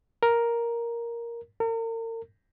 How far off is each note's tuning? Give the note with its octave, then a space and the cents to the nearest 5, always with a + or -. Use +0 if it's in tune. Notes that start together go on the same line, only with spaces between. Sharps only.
A#4 +5
A#4 -40